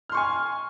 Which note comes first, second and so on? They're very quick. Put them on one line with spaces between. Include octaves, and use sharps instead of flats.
F6 C6 C#6 G#5